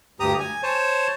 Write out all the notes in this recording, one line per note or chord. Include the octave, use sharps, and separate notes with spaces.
D2 G2 G4 A#5 D#6
G#5
C5 C#5 A5